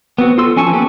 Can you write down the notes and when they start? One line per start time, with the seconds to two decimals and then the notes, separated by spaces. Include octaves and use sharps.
0.18 B3 C4 F#4
0.38 F4 A4 C6 E6
0.56 F3 C#4 G#5 A5 C#6
0.72 A#3 B3 G4 A4 B4